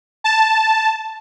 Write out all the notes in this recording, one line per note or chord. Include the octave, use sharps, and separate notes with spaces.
A5